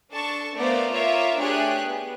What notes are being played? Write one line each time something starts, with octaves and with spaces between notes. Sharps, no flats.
D4 A4 A5 C#6
A3 B3 A#4 C5 D5 F5
F4 A#4 C#5 E5 D6
A3 D4 G4 G#4 C#5 F#6
B3